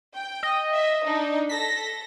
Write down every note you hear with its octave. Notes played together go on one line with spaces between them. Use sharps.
G5
D#5
E5
D4 D#4
A4 A#6 B6